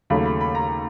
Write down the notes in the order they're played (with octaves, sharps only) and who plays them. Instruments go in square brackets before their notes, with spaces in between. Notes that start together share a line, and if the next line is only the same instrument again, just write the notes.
[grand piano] D#2 C#3 F#3 A3 B5
B5
B5
A#5